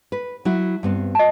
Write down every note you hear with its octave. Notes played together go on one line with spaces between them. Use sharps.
B4
F#3 E4 F#4
G2 B3 C4
D#5 A5